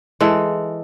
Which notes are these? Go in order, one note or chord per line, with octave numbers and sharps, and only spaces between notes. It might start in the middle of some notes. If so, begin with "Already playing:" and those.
E3 G#3 A4